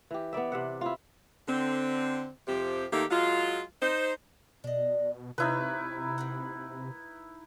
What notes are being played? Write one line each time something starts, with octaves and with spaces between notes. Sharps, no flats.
E3 G4
B3 E4 D5 E5
C3 E5 F#5
E4 F4
D3 C4
F2 C3 F3 C4 G4
D#3 A3 A#3 D#4 G4
F#3 G#3 F4
D#4 C5
B2 D4 D#5
C3 F3 D#4 E4 B4 C#5
E3 A#3 F#5